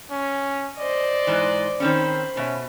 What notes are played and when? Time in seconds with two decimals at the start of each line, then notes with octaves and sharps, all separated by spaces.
0.11 C#4
0.78 C5 D5 D#5
1.27 G#2 E3
1.80 D#3 C4 C#4 C5 B5
2.37 B2 C#4 E5